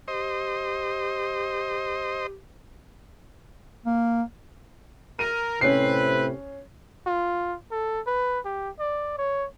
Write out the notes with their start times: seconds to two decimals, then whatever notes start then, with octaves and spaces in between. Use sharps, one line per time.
0.08 G4 C5 D#5
3.86 A#3
5.19 A#4 D#7
5.61 A2 C3 C4 C#4 B4 C7
7.07 F4
7.71 A4
8.07 B4
8.45 G4
8.80 D5
9.18 C#5